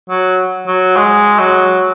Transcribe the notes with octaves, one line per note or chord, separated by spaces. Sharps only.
F#3
F#3
G#3
F#3